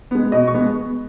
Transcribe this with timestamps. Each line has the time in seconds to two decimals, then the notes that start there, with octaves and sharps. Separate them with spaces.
0.11 G#3 B3
0.32 B2 D#5
0.47 C#6
0.54 G#3 B3